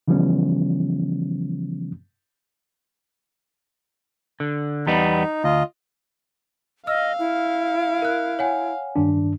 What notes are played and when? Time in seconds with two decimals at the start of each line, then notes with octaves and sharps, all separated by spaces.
0.08 C#3 E3 F3 G3 B3 C#4
4.40 D3
4.87 E2 G3 B3 D#4
5.44 D2 F4 D#5
6.87 D#5 F5 E6 F6
7.19 E4
8.02 A#4 F#6
8.39 C#5 F#5 G#5
8.96 G2 D#3 D4